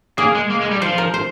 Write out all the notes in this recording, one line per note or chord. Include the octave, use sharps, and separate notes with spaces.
A#3 G#4
G#3
A#3
G#3
G3
F3 C5
A#4
C5